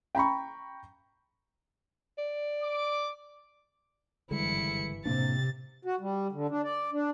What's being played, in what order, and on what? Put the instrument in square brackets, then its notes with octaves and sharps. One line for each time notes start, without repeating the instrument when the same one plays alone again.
[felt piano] G5 A#5 B5 C#6
[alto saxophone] D5
[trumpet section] D6
[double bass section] F#1 G2 E3 [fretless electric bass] D3 G3 G#3 [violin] E4 C#7
[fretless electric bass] A2 A#3 D4 [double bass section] C3 [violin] A6
[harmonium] F#4
G3
D3
D4
D5
D4